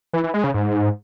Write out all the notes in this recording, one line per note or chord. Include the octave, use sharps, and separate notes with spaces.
E3
E3
G#3
C#3
G#2